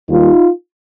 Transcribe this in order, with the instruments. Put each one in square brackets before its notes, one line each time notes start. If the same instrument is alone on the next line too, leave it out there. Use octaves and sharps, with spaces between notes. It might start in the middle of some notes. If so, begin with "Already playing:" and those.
[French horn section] D#2 D#3 G3 A#3 D#4 F4